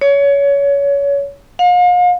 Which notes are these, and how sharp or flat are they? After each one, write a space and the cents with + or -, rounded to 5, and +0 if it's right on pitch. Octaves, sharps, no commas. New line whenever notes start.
C#5 +25
F5 +40